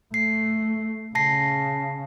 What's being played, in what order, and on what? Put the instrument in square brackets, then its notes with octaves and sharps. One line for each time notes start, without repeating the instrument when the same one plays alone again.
[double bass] A3 [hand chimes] C7
[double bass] C#3 [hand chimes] A5 A#6 C7